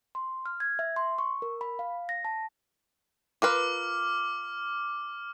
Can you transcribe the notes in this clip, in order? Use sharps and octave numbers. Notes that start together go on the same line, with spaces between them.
C6
F6
G#6
E5
C6
C#6
A#4
B5
F5
A#6
A5
F4 A#4 B4 D6 F6